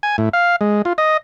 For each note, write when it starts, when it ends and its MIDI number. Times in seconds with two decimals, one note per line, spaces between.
0.03 0.16 80
0.18 0.29 45
0.33 0.56 77
0.61 0.82 56
0.85 0.93 65
0.98 1.17 75